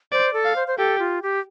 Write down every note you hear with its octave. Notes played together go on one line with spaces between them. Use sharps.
C5 D5
A4
F5
C5
C5
G4 A4
F4
G4